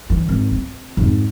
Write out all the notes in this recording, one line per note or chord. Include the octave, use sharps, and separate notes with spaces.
D3 E3
G#1
C4
F2 G#2